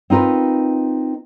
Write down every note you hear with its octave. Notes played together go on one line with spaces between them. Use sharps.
C4 D#4 F4 A#4 B4